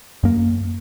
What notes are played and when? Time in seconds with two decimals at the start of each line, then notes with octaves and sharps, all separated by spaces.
0.23 F#2 A#3